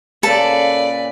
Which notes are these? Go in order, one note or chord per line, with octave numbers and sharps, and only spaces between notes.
A#2 C#3 A4 B4 D5